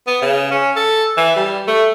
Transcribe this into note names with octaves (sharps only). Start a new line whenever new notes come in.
B3
C#3
C#4
A4
E3
G3
A3